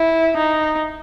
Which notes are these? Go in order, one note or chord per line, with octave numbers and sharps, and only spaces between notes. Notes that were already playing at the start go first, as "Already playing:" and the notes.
Already playing: E4
D#4